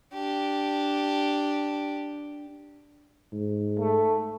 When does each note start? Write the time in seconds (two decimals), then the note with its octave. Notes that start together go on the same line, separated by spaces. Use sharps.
0.13 D4 G4
3.32 G#2
3.80 A3